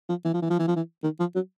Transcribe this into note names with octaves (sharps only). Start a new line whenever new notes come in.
F3
E3
F3
E3
F3
E3
F3
E3
D#3
F3
F#3